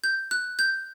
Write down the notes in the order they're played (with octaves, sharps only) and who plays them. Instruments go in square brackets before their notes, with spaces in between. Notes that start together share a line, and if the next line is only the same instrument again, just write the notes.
[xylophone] G6
F#6
G6